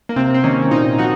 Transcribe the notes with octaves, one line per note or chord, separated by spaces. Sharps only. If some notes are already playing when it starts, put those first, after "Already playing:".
A#3
C3 C4
C4
D#3 A#3 C#4
A#2 C4 D#4
F3 D#4 F#4